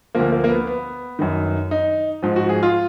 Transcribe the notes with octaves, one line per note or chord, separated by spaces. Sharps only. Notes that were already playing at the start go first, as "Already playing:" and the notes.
D2 D3 F3 A#3
A#3
A#3
B3
B3
F#2 D#3
D#4
G#2 F3
F#4
G#4
F4